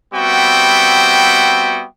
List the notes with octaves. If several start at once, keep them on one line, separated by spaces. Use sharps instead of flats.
G3 B3 C4 F#4 E5 G5